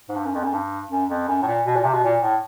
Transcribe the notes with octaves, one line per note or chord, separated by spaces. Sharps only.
G#2
G2
F#2
F2
F#2
G2
F#2
F2
F#2
A2
A#2
B2
A#2
C3
B2
A#2
A2